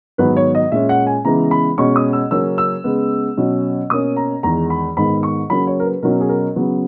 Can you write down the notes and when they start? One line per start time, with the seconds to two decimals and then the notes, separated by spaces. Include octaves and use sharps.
0.18 G#2 D#3 F#3 B3 B4
0.37 C#5
0.55 D#5
0.72 A#2 G#3 C#4 E5
0.89 F#5
1.07 G#5
1.25 C#3 E3 G#3 B3 A#5
1.51 B5
1.78 B2 G#3 C#4 C#6
1.96 D#6
2.13 E6
2.31 C#3 F#3 A#3 C#4 E6
2.58 E6
2.84 C#3 G#3 B3
3.37 B2 F#3 C#4
3.90 B2 A#3 C#4 D#6
4.16 A#5
4.43 E2 D#3 G#3 A#5
4.70 B5
4.97 G#2 D#3 G#3 B3 B5
5.23 C#6
5.50 C#3 F#3 A#3 C#4 B5
5.67 C#5
5.80 A#4
5.85 B4
6.03 B2 F#3 C#4 A#4
6.21 G#4
6.29 A#4
6.56 C#3 F#3 B3